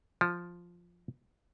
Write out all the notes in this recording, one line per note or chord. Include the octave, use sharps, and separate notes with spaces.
F3